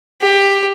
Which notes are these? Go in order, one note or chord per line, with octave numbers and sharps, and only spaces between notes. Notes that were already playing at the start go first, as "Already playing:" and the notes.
G4